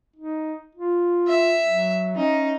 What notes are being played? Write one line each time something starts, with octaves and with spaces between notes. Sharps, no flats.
D#4
F4
E5
F#3
C#4 D#4